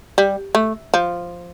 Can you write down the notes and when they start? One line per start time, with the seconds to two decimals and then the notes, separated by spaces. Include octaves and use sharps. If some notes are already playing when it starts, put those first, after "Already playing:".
0.18 G3
0.55 A3
0.94 F3